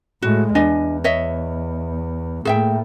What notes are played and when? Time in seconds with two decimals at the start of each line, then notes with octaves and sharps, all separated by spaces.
0.22 A2 G#3 F#4
0.55 E2 D4 D#5 G#5
1.04 C#5 D#5 E5
2.45 A2 A#3 G#4 E5 G5